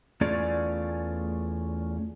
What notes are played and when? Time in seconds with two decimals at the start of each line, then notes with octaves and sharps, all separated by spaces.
0.21 E2 A3 C#4 F4 G#4 D5